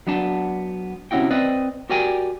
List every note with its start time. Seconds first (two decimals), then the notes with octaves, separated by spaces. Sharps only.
0.07 F#3 B3 D4 A5
1.11 C3 C#4 E4 F#4 G5
1.31 C4 B4 D5 D#5
1.90 F#4 G4 A#4 D5 G5 G#5